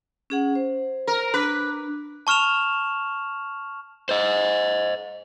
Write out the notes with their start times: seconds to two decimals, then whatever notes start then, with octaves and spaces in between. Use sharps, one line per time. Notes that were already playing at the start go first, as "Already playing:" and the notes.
0.30 C#4 G#4 F#5
0.55 C5
1.07 A#4
1.34 D4 B4
2.27 A5 C#6 F6 E7 F7
4.09 C5 D#5